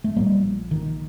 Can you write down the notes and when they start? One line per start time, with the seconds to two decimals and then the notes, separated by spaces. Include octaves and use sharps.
0.04 A3
0.16 A#1 A#2 G3 A#3
0.71 D#3